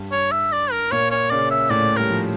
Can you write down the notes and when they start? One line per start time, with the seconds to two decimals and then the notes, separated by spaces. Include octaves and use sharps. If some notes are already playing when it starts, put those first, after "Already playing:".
Already playing: G2 G3
0.12 C#5
0.32 E5
0.52 D5
0.72 A#4
0.91 A#2 A#3 C#5
1.11 C#5
1.31 C#3 C#4 D5
1.51 E5
1.70 A2 A3 D5
1.97 G3 A#4
2.10 F3